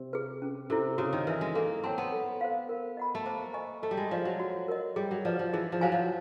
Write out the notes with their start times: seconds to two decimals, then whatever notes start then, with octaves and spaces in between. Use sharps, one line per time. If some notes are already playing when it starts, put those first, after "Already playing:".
Already playing: C3
0.13 G#4 B4
0.42 C#4
0.70 C3 E4 A4 C5
0.98 C#3 F#4
1.13 D#3
1.27 E3 B4 E5 G#5
1.41 G#3
1.55 A#3 A4
1.84 C4 C#5 F#5 A5 C6
1.98 B3
2.12 A4
2.41 C5 F5
2.69 A#4
2.97 D#5 F#5 B5
3.15 A3
3.26 A#3 C5
3.54 D#5 G#5 C#6
3.82 A3 A4
3.91 G3
3.97 G#3
4.11 F3 D5 F5
4.25 F#3
4.40 F#4
4.68 A#4 D#5
4.96 G3 G#4
5.11 F#3
5.25 F3 B4 D5
5.39 F3
5.53 E3 G#4
5.72 F3
5.81 F#3 C5 F5 G#5
5.92 F3